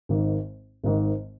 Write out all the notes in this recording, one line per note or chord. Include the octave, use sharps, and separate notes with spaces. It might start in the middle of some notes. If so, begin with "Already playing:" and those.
G#1 G#2 D#3
G#1 G#2 D#3